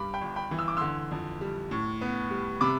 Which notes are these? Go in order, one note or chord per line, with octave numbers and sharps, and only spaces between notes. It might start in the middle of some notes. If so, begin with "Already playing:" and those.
Already playing: G2 G3 B5 D6
G5 B5
G1
G5 B5
E3
E6
D6
D3 C6 E6
F2
G3
A2
B3
G3
C3 B5 D6